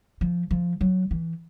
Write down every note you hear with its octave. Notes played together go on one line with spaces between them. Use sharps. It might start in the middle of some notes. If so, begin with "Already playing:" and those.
F3
F3
F#3
E3